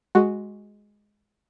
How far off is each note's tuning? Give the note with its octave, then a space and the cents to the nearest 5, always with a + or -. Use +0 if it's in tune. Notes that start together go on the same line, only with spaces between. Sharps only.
G#3 +0 F#4 +0